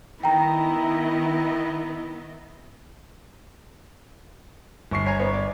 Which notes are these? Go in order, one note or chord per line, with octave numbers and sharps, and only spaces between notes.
D#3 B3 E4 D#5 G5 A#5
G1 C#6 C7
C#5 G#5 A#5
B3 C#5
D5